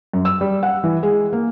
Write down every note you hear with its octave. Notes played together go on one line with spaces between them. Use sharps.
F#2
E6
G3
F#5
E3
G#3
A#3